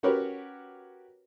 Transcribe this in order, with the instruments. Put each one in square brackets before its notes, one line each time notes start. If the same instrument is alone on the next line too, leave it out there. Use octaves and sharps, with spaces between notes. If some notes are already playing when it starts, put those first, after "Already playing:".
[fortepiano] C#4 F#4 G4 A#4 B4 C#5